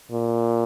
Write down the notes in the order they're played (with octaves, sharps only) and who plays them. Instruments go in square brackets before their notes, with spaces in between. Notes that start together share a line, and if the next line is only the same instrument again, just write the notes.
[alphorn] A#2